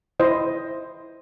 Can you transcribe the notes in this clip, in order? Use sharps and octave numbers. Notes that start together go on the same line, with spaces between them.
E4 C5 D#5